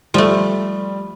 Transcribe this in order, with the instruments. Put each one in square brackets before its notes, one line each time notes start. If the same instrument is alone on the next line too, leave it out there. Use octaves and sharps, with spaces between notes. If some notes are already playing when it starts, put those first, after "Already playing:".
[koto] F3 A3 [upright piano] G3